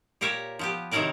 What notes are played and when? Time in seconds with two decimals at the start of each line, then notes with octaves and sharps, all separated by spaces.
0.21 A#2 G4 A#4 C#5 E5
0.59 F3 B3 G4
0.91 C3 D#3 F#3 E4 A#4 D5